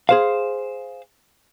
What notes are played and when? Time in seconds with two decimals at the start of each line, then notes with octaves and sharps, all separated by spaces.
0.09 G#4 C5 F5